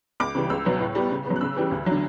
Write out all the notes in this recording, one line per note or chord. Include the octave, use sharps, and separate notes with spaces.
C#2 D6
C#3 E3 G3
C#2 E6
B2 F#3 B3
A2
G3 B3
C#3
F#3 B3
F#6
C#3 E6
E3 G3
D2
D3 F#3